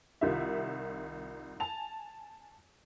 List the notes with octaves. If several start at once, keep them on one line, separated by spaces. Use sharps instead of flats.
C2 D#3 F4 G4 E5
G#5 A5 F7